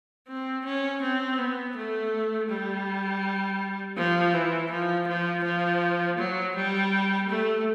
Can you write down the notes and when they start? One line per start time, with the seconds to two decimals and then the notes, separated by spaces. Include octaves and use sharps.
0.28 C4
0.65 C#4
1.02 C4
1.38 B3
1.75 A3
2.49 G3
3.97 F3
4.33 E3
4.71 F3
5.07 F3
5.44 F3
6.18 F#3
6.55 G3
7.29 A3